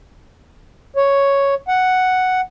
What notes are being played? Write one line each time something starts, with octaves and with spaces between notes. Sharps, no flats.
C#5
F#5